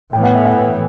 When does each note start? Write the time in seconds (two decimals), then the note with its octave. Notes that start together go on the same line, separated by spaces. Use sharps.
0.13 A2 E3 B3 G5
0.24 F#5
0.35 E5
0.45 F#5